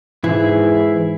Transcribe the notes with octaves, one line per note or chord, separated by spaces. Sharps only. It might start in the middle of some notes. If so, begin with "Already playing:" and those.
G#2 E3 E4 G#4